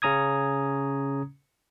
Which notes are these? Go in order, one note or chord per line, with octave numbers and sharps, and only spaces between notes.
C#3 C#4 A#5 D#6 G#6